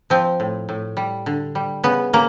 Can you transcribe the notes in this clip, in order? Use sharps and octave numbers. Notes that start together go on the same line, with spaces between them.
F3 C4
A2
A2
G3
D3
G3
C#3 B3
C#3 A#3